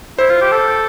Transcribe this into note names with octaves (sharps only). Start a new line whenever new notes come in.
E4 C5
F4
G4
A4